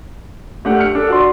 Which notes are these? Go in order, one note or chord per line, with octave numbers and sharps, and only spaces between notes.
A3 D4 G4 F#5 G5
F6 C#7
D4 A4
F#4 D5 C6